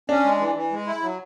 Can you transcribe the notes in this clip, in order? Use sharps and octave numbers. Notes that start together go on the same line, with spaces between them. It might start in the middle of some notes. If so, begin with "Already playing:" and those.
C#4 D4
G#3
E3
E3
G#3
E4
F#3